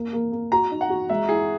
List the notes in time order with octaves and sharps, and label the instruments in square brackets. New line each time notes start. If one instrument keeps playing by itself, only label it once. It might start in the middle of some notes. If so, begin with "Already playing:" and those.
Already playing: [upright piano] A#3
A#3
A#3
[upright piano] F#4 [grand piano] A#5
[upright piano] D#4
[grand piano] F#5
[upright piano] F#4
[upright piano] G#3 [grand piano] E5
[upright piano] E4 [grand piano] G#4